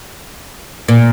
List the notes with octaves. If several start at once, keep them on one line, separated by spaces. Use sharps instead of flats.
A#2